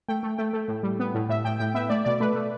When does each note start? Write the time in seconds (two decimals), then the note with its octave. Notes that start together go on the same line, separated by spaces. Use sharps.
0.08 A3 G5
0.23 A3
0.38 A3 G5
0.53 A3
0.68 A2
0.83 G3
0.99 B3
1.14 A2
1.29 A2 E5
1.45 A2 G5
1.59 A2 G5
1.74 B3 E5
1.90 A3 D5
2.05 B2 D5
2.20 A3 B4
2.35 A3